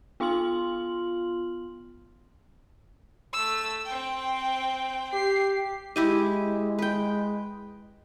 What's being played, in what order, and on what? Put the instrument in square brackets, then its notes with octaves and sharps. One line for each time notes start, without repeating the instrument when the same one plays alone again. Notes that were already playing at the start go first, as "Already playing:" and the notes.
[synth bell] B3 F4 F5 C6 F6 F#7
[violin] A3 E6
C4 G5
[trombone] G4 [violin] C7
[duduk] G#3 [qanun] E4 G4 D#5
[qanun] B4 G5